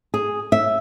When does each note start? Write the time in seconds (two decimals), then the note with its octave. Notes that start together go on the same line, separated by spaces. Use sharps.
0.14 G#4
0.52 E5